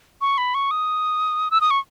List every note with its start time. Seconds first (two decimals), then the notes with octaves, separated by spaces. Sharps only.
0.21 C#6
0.38 B5
0.54 C#6
0.71 D#6
1.51 E6
1.61 D#6
1.71 C#6